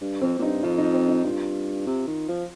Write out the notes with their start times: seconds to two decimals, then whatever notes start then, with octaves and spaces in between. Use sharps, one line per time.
0.01 G2
0.21 F2 C4
0.38 A#2
0.42 G2 D#4
0.63 F2 F4
0.78 D#4
0.93 C4
1.09 D#4
1.24 G2 F4
1.87 C3
2.07 D#3
2.28 F3